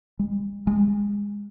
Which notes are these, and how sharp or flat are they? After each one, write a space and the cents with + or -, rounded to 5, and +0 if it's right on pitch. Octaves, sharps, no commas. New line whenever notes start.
G#3 -45
G#3 -25